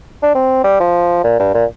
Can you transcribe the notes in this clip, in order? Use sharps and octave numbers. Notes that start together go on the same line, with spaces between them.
D4
C4
G3
F3
A#2
G2
A#2